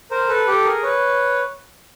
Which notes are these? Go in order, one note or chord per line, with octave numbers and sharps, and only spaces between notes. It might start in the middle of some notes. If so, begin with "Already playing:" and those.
A#4 C5
A4 B4
G4 A4
G#4 A#4
B4 C#5